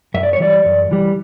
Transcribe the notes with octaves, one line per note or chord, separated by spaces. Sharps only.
F#2 E5
D5
C#5
E3 G3 D5
F#2
E3 G3